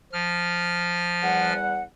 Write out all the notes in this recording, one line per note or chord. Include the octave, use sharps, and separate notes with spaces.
F3 F6
E2 G3 F#5